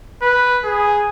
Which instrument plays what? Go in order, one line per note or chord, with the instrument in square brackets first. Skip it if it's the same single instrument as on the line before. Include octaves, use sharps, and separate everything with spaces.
[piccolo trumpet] B4
G#4